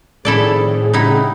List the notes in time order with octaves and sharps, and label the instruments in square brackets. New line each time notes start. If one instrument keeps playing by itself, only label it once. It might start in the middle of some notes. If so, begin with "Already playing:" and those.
[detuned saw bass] A2 [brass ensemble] D#3 F3 C4 [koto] E4 A4 D5 [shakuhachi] G#4
[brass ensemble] C#3 G3 F#5 [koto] D#4 E4